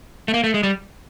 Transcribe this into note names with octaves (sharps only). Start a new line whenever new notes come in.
A3
A#3
A3
G#3
G3